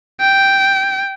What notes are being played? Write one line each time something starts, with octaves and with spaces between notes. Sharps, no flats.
G5